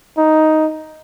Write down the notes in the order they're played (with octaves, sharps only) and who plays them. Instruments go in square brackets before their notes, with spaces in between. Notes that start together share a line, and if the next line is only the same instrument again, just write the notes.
[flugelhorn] D#4